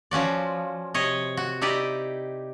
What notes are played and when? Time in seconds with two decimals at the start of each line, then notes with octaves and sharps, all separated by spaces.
0.11 F3 C#4 F#4 D5
0.94 C3 C#5 D#5
1.37 F#4
1.61 D#4 E4 G4 D5 D#5